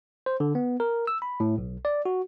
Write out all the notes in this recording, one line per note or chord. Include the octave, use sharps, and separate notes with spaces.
C5
D3
B3
A#4
E6
B5
A2
B1
D5
F#4